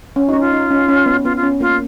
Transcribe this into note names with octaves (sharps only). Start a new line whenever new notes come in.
C#4
C#4 D#4 F#4
F4
D#4
C#4
C#4
B3
B3 F4
F4
C#4
A#3 F4